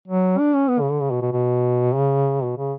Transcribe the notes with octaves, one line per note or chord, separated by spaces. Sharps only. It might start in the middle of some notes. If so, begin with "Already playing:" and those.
F#3
D4
C#4
B3
C#3
D3
C#3
B2
B2
B2
C#3
B2
C#3